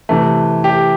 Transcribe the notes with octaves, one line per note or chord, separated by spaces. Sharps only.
C3 E3 A3
G4